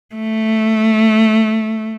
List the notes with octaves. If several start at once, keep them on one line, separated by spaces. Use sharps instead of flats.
A3